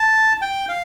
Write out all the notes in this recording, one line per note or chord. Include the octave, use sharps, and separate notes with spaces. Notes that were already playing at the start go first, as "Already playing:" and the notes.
Already playing: A5
G5
F5